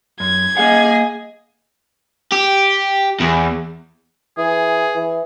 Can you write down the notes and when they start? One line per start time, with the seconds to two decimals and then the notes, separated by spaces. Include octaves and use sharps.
0.20 F#2 G#6
0.57 A#3 G#4 D#5 F5 F#5
2.32 G4
3.20 E2
4.38 E3 G#4
4.95 E3